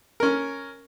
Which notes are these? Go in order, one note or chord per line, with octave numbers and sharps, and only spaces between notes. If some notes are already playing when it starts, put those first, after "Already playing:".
C#4 A#4